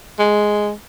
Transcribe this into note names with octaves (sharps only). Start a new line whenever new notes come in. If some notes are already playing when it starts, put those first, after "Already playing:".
G#3